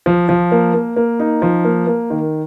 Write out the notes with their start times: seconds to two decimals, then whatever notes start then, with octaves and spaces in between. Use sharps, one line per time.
0.06 F3
0.29 F3
0.52 A#3
0.74 A#3
0.96 A#3
1.20 D#4
1.42 F3
1.65 A#3
1.87 A#3
2.10 D#3